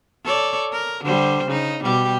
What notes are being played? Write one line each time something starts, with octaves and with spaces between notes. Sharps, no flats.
A4 C#5 D5
A#4
D3 G3 C5
C#3 D#4
B2 G3 G4